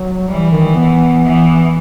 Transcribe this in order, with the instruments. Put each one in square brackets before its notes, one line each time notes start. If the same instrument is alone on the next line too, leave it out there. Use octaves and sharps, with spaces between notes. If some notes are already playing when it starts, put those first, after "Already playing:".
Already playing: [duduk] F#3
[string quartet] E3 [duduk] G3
[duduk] D#3
B3
[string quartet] E3